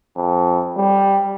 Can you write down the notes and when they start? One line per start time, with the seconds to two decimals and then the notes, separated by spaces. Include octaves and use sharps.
0.16 F2
0.77 G3